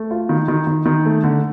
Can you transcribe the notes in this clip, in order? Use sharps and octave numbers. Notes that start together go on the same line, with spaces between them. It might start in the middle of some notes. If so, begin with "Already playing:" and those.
Already playing: A3
F4
D#3
D#3
D#3
D#3
A3
D3